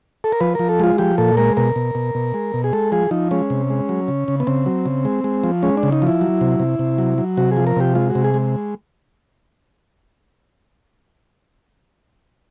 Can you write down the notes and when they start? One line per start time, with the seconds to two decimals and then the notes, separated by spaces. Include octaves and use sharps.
0.24 A4
0.32 A#4
0.40 F3 B4
0.55 F3 A#4
0.69 A4
0.80 G#3 F4
0.98 F3 G4
1.18 A#2 A4
1.37 G#3 A#4
1.57 B2 A#4
1.76 B2
1.95 B2
2.15 B2
2.34 G#3
2.54 B2
2.64 G#4
2.73 G#3 A4
2.92 F3 G#4
3.11 F3 D#4
3.31 G#3 C#4
3.50 C3
3.70 G#3
3.89 F#3
4.08 C#3
4.28 C#3
4.40 B3
4.47 C#3 C4
4.66 F#3
4.86 C#3
5.05 G#3
5.24 G#3
5.44 F3
5.63 G#3 C#4
5.77 D4
5.83 C#3
5.92 D#4
6.02 F3 E4
6.21 F#3
6.41 C3
6.60 C3
6.79 C3
6.98 F#3
7.18 F#3
7.37 C3 F#4
7.52 G#4
7.57 F3
7.67 A#4
7.76 C3 G4
7.95 G#3 F4
8.10 F#4
8.15 C3
8.24 G#4
8.34 G#3